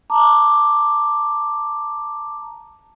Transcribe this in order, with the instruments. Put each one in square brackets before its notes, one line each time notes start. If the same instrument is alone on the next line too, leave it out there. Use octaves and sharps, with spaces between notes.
[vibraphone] A5 A#5 D6